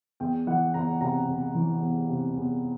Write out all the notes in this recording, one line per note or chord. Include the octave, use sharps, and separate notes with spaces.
E2 G5
E3 F#5
E2 A#5
C3 A#5
E2
E3
E2
C3
E2